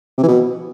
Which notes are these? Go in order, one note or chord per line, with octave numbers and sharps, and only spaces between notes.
C3
E3
B2